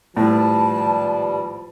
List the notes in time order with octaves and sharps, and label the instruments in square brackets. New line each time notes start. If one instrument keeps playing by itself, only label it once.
[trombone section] G#1 F3 B4 [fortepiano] A2 [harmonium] G3 [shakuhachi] A5